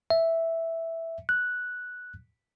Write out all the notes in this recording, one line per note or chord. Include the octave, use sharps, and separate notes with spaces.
E5
F#6